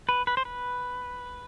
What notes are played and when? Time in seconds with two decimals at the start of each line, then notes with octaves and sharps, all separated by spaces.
0.09 B4
0.27 B4
0.37 C5
0.45 B4